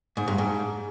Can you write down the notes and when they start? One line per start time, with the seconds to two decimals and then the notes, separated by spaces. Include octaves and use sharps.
0.17 G#2
0.28 G2
0.38 G#2